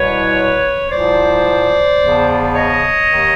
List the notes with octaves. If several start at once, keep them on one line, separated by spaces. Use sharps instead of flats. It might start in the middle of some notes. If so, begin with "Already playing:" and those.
Already playing: C2 B2 B4 C#5
C2 A#2 F3 C5 D5
E2 C#3 F3
C#5 D#5
D#2 D#3